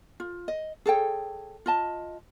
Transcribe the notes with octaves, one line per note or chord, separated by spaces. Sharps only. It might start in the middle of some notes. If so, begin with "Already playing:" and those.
F4
D#5
G#4 A4 C#5 G5
F4 D#5 A5